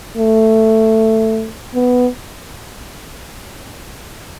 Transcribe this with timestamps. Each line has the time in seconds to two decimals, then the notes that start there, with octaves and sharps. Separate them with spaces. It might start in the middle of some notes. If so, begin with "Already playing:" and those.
0.17 A3
1.74 B3